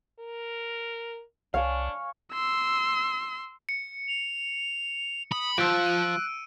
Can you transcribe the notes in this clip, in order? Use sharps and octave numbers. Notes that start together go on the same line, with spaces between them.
A#4
C2 D4 C#5 F5 G#5
C6 E6
C#7
F7
B5 D#6
F3 E6 F#6 D7
D#7